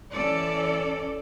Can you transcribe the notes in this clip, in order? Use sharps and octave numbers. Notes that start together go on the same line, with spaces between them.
E3 C#4 A4 D5